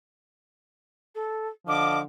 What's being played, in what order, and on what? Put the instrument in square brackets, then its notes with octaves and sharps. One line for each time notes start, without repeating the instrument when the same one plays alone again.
[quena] A4
[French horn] D3 [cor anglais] F3 [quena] D#5 [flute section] D6